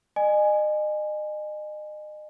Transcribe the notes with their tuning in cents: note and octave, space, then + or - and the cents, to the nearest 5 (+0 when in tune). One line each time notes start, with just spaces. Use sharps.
D#5 -35 G#5 +0